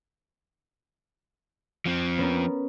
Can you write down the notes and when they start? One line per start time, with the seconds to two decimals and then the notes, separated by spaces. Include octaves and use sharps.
1.86 F3 C4
2.18 B3 C#4 A#4